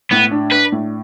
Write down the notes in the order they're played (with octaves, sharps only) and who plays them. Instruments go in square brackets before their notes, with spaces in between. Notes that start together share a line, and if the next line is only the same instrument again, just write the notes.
[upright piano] A2 [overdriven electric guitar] B3
[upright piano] D4
[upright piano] D4 [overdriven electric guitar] B4
[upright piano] A2